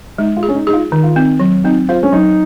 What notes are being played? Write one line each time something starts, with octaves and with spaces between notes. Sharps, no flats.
G#3 D#4
F4
G#4
C#4
D#4
D#4 G#4
F4
D#3 D#4
F4
C4 D#4
F#3
C4 D#4
F4 C5
C#4
F#3 D#4